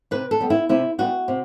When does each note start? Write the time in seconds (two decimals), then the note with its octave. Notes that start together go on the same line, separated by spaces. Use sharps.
0.11 C3 B4
0.31 A4
0.40 G3 B3
0.50 E4
0.69 C3 E4
0.99 G3 B3 F#4
1.28 C3